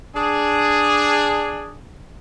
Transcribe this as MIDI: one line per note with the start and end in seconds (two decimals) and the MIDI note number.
0.15 1.77 62
0.15 1.77 68